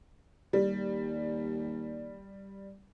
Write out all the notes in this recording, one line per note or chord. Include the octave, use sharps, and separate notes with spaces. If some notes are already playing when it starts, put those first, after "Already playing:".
D#2 G3